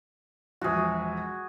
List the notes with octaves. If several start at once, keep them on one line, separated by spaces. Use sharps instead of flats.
E1 A#1 F3 F#4 G#4